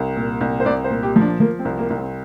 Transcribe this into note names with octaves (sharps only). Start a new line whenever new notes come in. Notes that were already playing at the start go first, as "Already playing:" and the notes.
Already playing: C2
A#2
C2
C5
C2 D5
C5
A#2
G4
F3
D4
F3 A#3
C4
C2
A#3
C2
C4